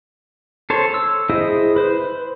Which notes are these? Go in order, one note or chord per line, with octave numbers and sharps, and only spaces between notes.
A4 C5 C#5
E6
E4 G#4 C5 D#5
B4 C5